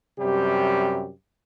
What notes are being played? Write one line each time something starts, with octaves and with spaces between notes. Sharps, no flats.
F#2 C3 G3 G4